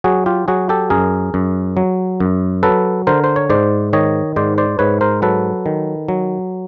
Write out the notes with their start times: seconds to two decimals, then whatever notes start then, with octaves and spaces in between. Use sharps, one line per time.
0.04 F#3 F#4 G#4
0.26 F4 G4
0.48 F#3 F#4 G#4
0.69 G4 A4
0.90 F#2 G#4 A#4
1.34 F#2
1.77 F#3
2.20 F#2
2.63 F#3 A4 B4
3.07 D3 A#4 C5
3.24 C5
3.36 C#5
3.50 G#2 C5 D5
3.93 D#3 C#5 D#5
4.36 G#2 C5 D5
4.58 C5 D5
4.79 G#2 B4 C#5
5.01 A#4 C5
5.22 F#3 A4 B4
5.66 D#3
6.08 F#3